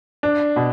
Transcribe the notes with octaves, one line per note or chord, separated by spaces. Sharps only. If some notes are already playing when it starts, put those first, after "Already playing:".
D4
B2